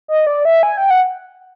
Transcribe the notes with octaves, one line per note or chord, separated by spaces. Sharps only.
D#5
D5
E5
G#5
G5
F#5